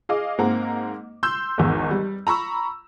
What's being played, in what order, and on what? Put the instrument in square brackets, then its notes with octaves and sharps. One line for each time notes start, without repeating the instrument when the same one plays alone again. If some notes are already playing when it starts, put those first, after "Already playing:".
[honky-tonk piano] G#4 D#5 F5 D6
G#2 A#3 C4 F#5 A#5
C6 E6 G6
G#1 E2 G#2
G3
A#5 B5 C#6 E6